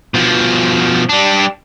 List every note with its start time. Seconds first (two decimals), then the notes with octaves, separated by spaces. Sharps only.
0.14 B2 F3
1.09 G3 D4